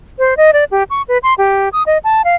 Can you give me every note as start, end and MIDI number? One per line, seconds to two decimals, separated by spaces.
0.19 0.37 72
0.37 0.51 75
0.53 0.64 74
0.71 0.83 67
0.90 1.02 85
1.08 1.18 71
1.23 1.34 84
1.38 1.69 67
1.73 1.83 87
1.86 1.98 75
2.04 2.22 81
2.25 2.35 77